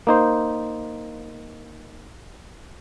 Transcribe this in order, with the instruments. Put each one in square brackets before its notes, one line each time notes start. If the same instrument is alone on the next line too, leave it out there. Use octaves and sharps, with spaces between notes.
[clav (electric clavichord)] A#3 D#4 C5